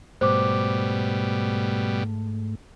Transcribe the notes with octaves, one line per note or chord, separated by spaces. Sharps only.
G#2 B2 G3 A3 C5 D6